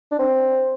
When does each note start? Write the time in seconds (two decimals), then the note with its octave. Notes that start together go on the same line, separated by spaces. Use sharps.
0.12 D4
0.19 C4